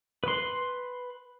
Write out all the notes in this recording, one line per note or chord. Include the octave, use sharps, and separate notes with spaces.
B4 C6